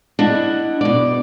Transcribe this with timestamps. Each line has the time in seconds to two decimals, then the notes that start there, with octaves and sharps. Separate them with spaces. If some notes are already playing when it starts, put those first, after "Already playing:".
0.19 D4 E4 D#5 F#5
0.81 B2 D5